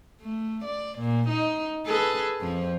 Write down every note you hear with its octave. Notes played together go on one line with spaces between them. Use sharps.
A3
D5
A#2
D#4
G#4 A4 B4
F2 F3